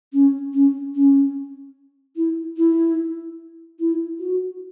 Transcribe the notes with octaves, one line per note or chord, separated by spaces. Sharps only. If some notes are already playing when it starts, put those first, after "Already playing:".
C#4
C#4
C#4
E4
E4
E4
F#4